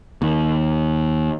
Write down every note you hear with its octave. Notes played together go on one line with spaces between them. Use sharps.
D#2